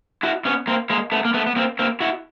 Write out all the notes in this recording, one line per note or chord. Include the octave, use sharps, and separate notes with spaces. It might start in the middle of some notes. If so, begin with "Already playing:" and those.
E4 F#4
B3 C#4
A#3 C4
G#3 A#3
A3 B3
A#3
A3 B3
B3
A#3 C4
A#3 C4
E4 F#4